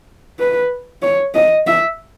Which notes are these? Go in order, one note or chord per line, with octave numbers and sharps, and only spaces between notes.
B4
C#5
D#5
E5